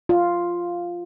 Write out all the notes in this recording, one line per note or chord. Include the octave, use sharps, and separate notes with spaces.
F4